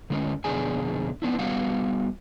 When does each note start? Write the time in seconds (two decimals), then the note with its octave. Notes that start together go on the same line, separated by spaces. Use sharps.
0.10 D3 G#3 C#4
0.44 F2 B2 D3 D4 G#4 G#5
1.22 B3 C4 D4 E4
1.39 G3 B3 F#4 F5 F#5